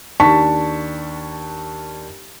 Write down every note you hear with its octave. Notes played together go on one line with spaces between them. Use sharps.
D#2 D4 A5 C#6 B6